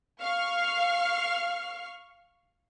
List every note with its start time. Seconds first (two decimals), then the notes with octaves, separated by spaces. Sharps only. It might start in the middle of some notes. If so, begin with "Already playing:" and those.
0.22 F5 C#6 F6 C7